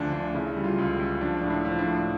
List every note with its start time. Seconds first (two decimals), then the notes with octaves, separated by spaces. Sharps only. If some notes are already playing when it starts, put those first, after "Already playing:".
Already playing: D2 D3 F3 D4
0.13 D2 D4
0.35 C#3 E4
0.56 G3
0.64 F4
0.78 C#2
1.00 C#2
1.21 F3 D4
1.41 A2 D4
1.50 E4
1.65 F3
1.79 D4
1.86 A2